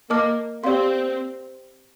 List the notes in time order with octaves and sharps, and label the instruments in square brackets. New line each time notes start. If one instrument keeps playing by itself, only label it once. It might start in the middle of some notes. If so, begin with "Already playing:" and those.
[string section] A#3 [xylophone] A#4 D#5 A5 D6 F6
[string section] C4 [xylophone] G4 D5 F5 C6